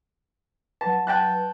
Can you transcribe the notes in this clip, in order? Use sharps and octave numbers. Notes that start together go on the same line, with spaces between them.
F#3 B4 A5
G5 A5 F#6